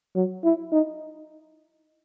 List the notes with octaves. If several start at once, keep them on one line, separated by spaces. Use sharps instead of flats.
F#3
E4
D#4